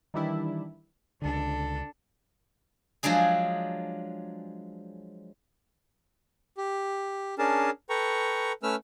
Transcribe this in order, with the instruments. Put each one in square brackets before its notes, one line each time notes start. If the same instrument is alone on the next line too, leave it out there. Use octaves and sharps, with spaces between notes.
[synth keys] D#3 E3 G3 D4 E4
[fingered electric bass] C#2 D3 [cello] D4 A4
[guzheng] F3 F#3 G#3 D4 G#4
[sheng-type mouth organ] G4
C#4 D4 G#4 A#4 A5
A4 B4 G5 A#5 C#6
A3 C#4 B4 E6 F6